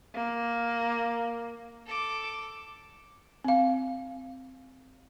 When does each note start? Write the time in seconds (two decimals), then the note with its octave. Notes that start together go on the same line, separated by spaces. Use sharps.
0.15 A#3
1.86 A4 D6
3.44 C4 F5